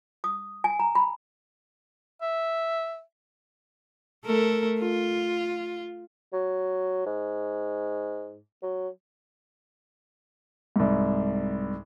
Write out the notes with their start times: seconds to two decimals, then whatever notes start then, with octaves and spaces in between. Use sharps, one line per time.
0.24 D#6
0.64 G#5
0.79 A#5
0.95 B5
2.22 E5
4.25 A3 A4 A#4
4.80 F4
6.33 F#3
7.06 G#2
8.63 F#3
10.76 C2 G#2